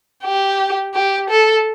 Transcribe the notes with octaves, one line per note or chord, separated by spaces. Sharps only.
G4
G4
A4